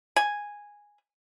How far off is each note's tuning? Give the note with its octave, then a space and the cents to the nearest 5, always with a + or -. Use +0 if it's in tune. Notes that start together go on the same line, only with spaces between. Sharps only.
G#5 -5